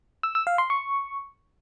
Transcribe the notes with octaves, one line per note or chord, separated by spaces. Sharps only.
E6
E6
F5
C6
C#6